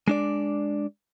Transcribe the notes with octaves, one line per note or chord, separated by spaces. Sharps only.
G#3 D4 D5